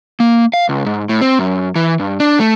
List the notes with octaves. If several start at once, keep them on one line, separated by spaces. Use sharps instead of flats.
A#3
F5
C#2
G#2
A2
C4
F#2
E3
G2
D4
A3